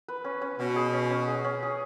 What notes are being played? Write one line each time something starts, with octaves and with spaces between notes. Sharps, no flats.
B4
C#4
C#4
B2 C#4
G#4
C#4
C#4
G#4
C#4
G#4